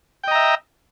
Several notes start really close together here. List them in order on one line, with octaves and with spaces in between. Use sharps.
G5 D#5 A#5 E5